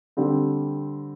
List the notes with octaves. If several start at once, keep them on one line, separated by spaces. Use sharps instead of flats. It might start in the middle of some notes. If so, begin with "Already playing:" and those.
D3 G3 C4